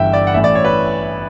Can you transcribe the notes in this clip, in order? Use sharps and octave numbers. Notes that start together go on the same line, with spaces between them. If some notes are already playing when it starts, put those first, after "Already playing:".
Already playing: G1 G2 E3 E5 G5
D5
F#5
A1 A2 E3 E5
D5
C#5
B4